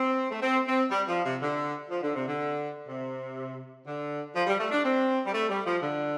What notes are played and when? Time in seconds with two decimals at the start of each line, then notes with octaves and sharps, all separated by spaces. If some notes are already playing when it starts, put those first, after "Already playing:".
Already playing: C4
0.30 A3
0.41 C4
0.66 C4
0.90 G3
1.07 F3
1.23 C3
1.40 D3
1.89 F3
2.01 D3
2.14 C3
2.27 D3
2.87 C3
3.86 D3
4.34 F3
4.46 G3
4.59 A3
4.71 D4
4.84 C4
5.25 G3
5.33 A3
5.49 G3
5.65 F3
5.82 D3